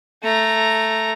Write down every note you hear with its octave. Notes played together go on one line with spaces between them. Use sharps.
A3 A#5